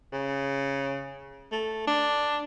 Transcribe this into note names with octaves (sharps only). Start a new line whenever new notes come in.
C#3
A3
D4